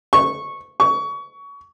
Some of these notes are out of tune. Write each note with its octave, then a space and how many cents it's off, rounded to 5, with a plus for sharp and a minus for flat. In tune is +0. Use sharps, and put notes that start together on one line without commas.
C#6 -10
C#6 +25